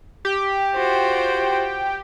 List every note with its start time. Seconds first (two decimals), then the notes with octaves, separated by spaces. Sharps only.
0.25 G4
0.75 F4 F#4 C5